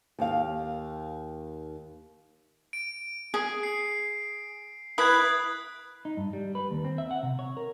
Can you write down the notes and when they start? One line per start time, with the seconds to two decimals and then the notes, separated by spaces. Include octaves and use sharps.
0.19 D#2 F5
2.73 D7
3.34 G#4
3.63 C7
4.98 E4 B4 D#6 F#6 G#6
6.05 D#4
6.17 G2
6.33 G3
6.55 B4
6.71 D#2
6.84 C4
6.98 E5
7.11 F#5
7.23 C3
7.39 C#5
7.57 A#4